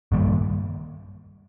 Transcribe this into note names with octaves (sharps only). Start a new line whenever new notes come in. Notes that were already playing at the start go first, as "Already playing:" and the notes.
G2 D#3 G3 A#3